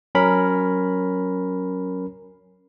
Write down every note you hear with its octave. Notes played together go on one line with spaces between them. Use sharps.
F#3 C#4 A#4 B5